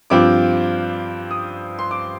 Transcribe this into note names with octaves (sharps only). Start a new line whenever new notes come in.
G2 F3 C4 F4 D6
D#6
C6
D6